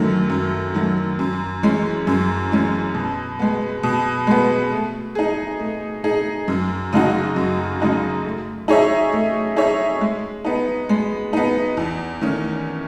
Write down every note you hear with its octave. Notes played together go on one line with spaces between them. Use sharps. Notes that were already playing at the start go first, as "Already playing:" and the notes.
Already playing: F#2 D#3 F#3 A3
F#2
D#3 F#3 A3
F#2
E3 G#3 C#4
F#2
E3 G#3 C#4
B2
G#3 B3
B2
G#3 B3
A3
D#4 G#4
A3
D#4 G#4
F#2
C#3 G#3 D#4 F#4
F#2
C#3 G#3 D#4 F#4
A3
D#4 G#4 C#5 E5
A3
D#4 G#4 C#5 E5
G#3
B3 D#4
G#3
B3 D#4
E2
D#3 A3 C#4